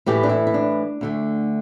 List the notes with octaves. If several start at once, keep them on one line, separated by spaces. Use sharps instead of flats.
A2 E3 A3 G4
D4
E4
E4
D4
D2 D3 A3